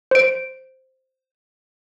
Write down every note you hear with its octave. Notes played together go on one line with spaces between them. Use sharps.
C5 D7